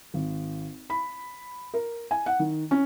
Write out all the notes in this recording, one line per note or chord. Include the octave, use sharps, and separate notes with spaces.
G#1
B5
A#4
G#5
F#5
D#3
C#4